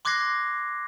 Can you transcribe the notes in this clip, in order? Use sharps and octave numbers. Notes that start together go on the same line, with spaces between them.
C6 D6 F#6 G#6 A#6 C7